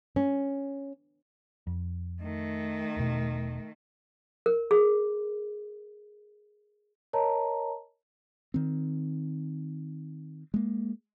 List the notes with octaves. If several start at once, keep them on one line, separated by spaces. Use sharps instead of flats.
C#4
F2
D#3 A3
E1 B2
A#4
G#4
A#4 C#5 D#5 A5 A#5
D#3 C4
G#3 A#3